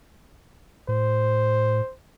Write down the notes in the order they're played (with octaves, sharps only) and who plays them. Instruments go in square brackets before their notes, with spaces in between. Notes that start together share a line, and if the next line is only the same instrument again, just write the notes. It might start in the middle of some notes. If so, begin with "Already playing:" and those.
[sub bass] A2 [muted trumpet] C5